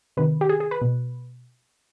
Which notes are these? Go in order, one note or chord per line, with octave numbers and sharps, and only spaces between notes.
C3 D#3 B4
G4
G#4
G#4
B4
B2